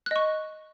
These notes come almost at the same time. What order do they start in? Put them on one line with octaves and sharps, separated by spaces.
F#6 D#5 C#6